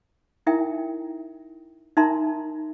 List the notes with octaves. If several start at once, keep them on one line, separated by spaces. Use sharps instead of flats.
D#4 E4 A#4 E5 G5
D#4 A#4 E5 A5 A#5 C6